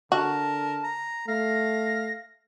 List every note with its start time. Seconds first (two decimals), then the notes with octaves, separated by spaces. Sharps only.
0.12 D3 F#4 A#4 A5
0.84 A#5
1.28 A3 F5 A#6